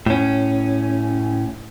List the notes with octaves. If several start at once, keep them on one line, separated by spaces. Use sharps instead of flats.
A2 C#4